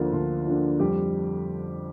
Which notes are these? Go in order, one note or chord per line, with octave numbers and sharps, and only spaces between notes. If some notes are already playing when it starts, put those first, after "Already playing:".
Already playing: D2 D3 F3 A#3 D4 F4
D2 F4
D3 F3 A#3 D4
F2 G3 G4